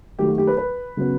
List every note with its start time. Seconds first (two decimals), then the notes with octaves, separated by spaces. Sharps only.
0.19 D#3 F#3 A3 G4
0.28 F#4
0.38 G4
0.47 B4
0.57 B4
0.97 C#3 F#3 B3